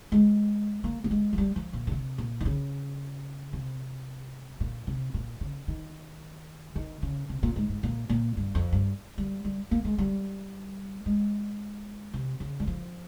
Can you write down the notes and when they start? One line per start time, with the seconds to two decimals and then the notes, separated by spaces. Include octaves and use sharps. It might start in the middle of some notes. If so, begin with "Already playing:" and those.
0.12 G#3
0.84 A#3
1.04 A#3
1.11 G#3
1.33 F3
1.38 G3
1.56 F3
1.73 A#2
1.87 C#3
1.92 C3
2.18 A#2
2.40 D#3
2.45 C#3
3.53 C3
4.60 A#2
4.87 C3
5.14 A#2
5.41 C#3
5.68 D#3
6.75 D#3
7.02 C#3
7.29 C3
7.43 A#2
7.56 G#2
7.69 G#2
7.83 A#2
8.09 A#2
8.37 G2
8.55 F2
8.72 G2
9.18 G3
9.44 G3
9.71 A#3
9.85 G#3
9.98 G3
11.06 G#3
12.14 C3
12.40 C#3
12.60 G3
12.67 F3